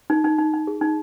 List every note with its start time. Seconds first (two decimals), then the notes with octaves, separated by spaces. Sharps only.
0.10 D#4
0.24 D#4
0.38 D#4
0.53 D#4
0.67 G#4
0.81 D#4